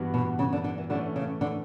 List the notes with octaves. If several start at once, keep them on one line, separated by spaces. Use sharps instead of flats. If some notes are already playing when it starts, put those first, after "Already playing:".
Already playing: G2 E3 B3 F#4
B2
C#3
D3
D3
E3
D3 E3 A3 C#4
C#3
D3